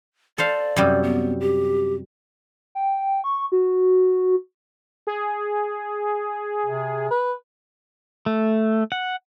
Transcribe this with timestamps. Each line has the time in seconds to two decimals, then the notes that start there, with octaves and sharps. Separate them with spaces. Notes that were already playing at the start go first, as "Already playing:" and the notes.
0.38 A4 C5 D5 F5
0.76 F#2 C3 G3
1.03 B3
1.41 G4
2.75 G5
3.24 C#6
3.52 F#4
5.07 G#4
6.66 C3
7.11 B4
8.26 A3
8.92 F#5